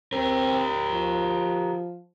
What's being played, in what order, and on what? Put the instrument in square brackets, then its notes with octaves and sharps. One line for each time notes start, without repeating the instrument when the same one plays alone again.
[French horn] C4 [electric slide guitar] G4 A#4
[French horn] F3